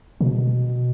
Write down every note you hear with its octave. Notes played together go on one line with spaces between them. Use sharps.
B2